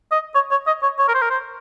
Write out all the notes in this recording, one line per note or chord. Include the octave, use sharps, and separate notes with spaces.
D#5
C#5
C#5
D#5
C#5
C#5
A#4
C5
A#4
C5